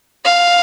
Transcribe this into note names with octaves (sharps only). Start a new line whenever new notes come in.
F5